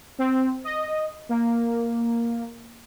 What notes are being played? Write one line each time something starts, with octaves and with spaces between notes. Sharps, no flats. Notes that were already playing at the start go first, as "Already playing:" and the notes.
C4
D#5
A#3